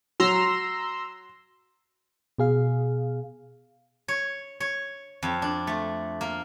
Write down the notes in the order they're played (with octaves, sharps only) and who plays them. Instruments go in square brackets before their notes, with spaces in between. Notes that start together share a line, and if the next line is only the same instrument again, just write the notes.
[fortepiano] F#3 [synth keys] A#5 C6 E6
[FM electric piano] B2 G#4 F5
[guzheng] C#5
C#5
F2
D4
A3
A#3